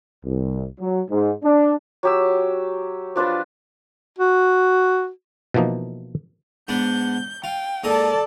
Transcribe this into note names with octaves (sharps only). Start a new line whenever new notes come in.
C2
F#3
G#2
D4
F#3 G4 E6
F3 D4 F4 B4
F#4
B2 E3 F3 A#3 D#4
G#2 B3 D4 G6
F4 G5
G#2 A#3 A4 D5 A5 D#6